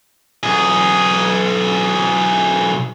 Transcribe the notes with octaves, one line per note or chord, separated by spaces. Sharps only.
B1 G#4